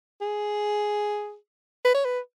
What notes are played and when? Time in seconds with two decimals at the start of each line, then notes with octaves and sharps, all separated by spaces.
0.21 G#4
1.85 B4
1.94 C#5
2.05 B4